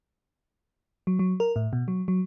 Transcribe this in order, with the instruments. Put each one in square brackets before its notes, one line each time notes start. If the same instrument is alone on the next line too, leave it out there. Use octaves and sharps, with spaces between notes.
[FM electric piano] F#3
F#3
A#4
A2
B2
F#3
F#3